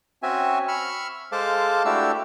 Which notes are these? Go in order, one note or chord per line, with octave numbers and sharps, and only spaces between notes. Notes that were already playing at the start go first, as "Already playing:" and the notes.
C4 C#4 F#4 E5 G#5
B5 C#6 E6 F6
G#3 A4 C5 F5 A5 D6
A3 D4 E4 F#4 G4 E6